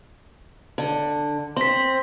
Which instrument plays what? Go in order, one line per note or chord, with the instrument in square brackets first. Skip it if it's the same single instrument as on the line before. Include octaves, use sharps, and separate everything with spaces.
[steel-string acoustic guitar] D3
[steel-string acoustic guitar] C4 [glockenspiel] C6 B6